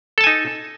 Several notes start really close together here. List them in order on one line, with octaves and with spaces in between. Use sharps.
A4 A5 G#5 D#4